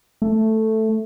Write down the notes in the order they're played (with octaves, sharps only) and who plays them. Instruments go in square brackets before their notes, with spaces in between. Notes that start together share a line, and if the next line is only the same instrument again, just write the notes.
[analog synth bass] A3